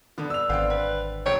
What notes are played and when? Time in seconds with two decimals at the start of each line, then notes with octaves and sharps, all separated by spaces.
0.18 B2 D3 G3 B3
0.30 E6 F7
0.49 G#1 D3 B3 C4 F5 G5
0.70 B4 B5
1.26 E1 C#5 G5